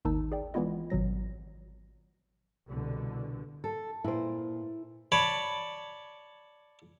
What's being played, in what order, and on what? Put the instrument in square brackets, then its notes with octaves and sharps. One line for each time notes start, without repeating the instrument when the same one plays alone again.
[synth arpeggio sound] G#1 D#2 D#3 D#4 A5 E6
G#4 D5 G5
E3 G#3 B3 E4 F4 D#5
G#1 B2 F#3 A#6
[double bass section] C2 B2 D3
[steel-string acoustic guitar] A4
[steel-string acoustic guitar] A#2 [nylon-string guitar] E4 C5
[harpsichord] C#5 D5 A5 B5